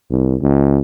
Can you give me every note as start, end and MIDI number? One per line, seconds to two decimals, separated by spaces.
0.11 0.35 36
0.41 0.80 37